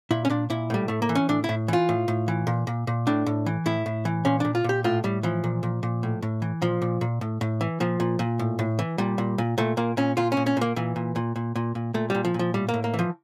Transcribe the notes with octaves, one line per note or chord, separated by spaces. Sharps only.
A#2 E4
C#4
A#2 D4
A#2 E4
A2 G3
A2 A3
A#3
E3
C#4
A2 D4
E4
A2
E3 F4
A2
A2
E3
A#2
A#2
A#2
A2 D4
A2
E3
A2 E4
A2
E3
A#2 C#4
A#2 D4
F4
A#2 G4
A2 F4
A2 G3
E3 F3
A#2
A#2
A#2
A2
A2
E3
A#2 F3
A#2
A#2
A2
A2
E3
A#2 F3
A#2
A#2
A2
A2
E3
A#2 G3
A#2
A#2
A#2 A3
A#2 A#3
A#2 C#4
A#2 F4
C#4
A#2
C#4
A#2 A#3
A#2 E3
A#2
A#2
A#2
A#2
A#2
A#2 A3
A#2 G3
F3
A#2
F3
A2 G3
A#3
A2
A#3
E3
F3